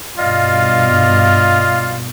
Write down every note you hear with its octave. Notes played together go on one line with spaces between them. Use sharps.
G2 B2 F4 D5 D#5 F5